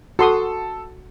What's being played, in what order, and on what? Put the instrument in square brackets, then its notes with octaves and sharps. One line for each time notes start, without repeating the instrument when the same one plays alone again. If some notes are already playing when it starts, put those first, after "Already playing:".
[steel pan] F#4 C6 D#6 [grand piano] A4